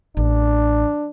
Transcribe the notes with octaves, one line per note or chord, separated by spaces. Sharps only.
A1 D4